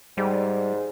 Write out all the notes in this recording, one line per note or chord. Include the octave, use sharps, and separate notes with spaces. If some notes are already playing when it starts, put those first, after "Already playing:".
G#2 G3